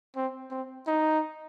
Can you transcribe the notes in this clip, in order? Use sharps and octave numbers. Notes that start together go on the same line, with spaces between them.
C4
C4
D#4